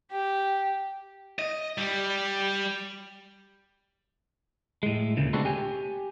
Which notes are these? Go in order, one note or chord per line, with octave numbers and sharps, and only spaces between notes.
G4
D#5
G3
A2 G#3
D2 A#2 C#3
G#3 A3 B3 C4 D4 F#4
G4 G#5